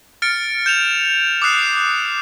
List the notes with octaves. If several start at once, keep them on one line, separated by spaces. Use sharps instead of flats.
F6 A6 C#7 D7
G6 E7 F7
D6 D#6 F#6 C7